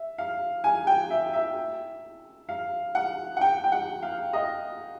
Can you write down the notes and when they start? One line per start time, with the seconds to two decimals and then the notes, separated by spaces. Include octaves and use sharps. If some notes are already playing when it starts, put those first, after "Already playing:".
Already playing: E5
0.18 F5
0.64 G#5
0.87 G5
1.10 E5
1.33 E5
2.49 F5
2.95 F#5
3.37 F#5
3.41 G5
3.64 G5
3.72 F#5
4.03 F5
4.33 D#5